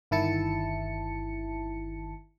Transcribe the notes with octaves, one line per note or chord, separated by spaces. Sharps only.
G1 D#3 E4 A5 C#7